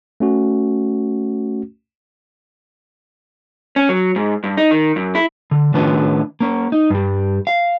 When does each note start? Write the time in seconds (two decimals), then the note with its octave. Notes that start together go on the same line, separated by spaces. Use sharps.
0.20 A3 C#4 F#4
3.76 C#4
3.89 F#3
4.16 G#2
4.44 G2
4.58 D#4
4.71 D#3
4.96 F#2
5.15 E4
5.51 D3
5.74 A2 D#3 C#4 D4 B4
6.41 A#3 C#4
6.72 D#4
6.90 G2 G3
7.47 F5